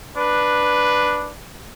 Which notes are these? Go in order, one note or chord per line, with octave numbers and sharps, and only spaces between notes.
D4 B4